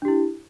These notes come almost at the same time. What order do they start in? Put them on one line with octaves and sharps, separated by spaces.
D4 G4 E4